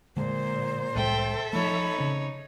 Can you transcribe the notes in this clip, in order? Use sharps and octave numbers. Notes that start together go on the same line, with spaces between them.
A#2 D3 G#3 C5
C2 A2 G#3 A4 E5 G5
F3 A3 D#4 C#5 B5
C#3 C4